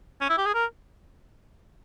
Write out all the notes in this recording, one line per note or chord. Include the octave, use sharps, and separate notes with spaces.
C#4
E4
G4
G#4
A#4